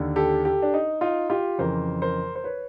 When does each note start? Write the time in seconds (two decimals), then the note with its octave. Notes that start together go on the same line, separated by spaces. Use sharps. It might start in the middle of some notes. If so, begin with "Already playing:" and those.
Already playing: D#2 D3
0.16 G4 A4
0.45 G4 A4
0.62 D4
0.74 D#4
1.01 D#4 F4
1.30 F4 G4
1.58 F2 C#3 E3 A#4 C5
2.02 A#4 C5
2.35 C5
2.44 B4 C#5